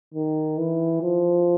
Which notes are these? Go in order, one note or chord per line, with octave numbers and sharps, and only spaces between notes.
D#3
E3
F3